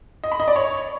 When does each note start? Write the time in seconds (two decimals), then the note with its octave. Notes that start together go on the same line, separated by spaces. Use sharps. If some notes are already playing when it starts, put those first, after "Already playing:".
0.24 D#5
0.32 B5
0.40 D#5
0.48 D5
0.56 C#5